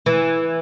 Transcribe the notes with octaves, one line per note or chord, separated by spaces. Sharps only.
E3